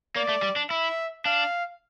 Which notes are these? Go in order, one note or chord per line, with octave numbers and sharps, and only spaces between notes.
A#3 D5
A3
G3
D4
E4 E5
D4 F5